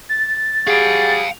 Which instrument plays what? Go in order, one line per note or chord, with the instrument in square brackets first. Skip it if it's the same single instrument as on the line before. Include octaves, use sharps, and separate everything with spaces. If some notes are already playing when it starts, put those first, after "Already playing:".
[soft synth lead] A6
[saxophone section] G3 F#4 G#4 [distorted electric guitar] F5 G5